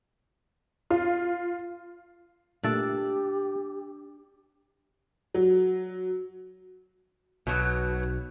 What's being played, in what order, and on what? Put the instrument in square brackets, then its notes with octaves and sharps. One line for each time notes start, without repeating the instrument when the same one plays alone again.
[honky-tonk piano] F4
[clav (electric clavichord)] A#2 A3 [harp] D4 E6 A6 [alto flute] G4
[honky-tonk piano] F#3
[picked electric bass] B1 [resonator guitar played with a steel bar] B2 F#3